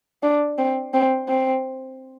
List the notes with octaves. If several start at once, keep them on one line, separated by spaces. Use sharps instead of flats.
D4
C4
C4
C4